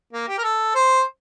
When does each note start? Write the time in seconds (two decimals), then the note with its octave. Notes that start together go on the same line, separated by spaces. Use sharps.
0.13 A#3
0.28 G4
0.38 A#4
0.44 A4
0.75 C5